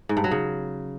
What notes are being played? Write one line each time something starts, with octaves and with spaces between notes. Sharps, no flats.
G#2
G2
F#3
C#3